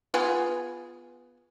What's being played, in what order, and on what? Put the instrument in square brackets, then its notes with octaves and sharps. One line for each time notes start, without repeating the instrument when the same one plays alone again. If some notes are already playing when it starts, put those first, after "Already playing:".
[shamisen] B3 F4 G#4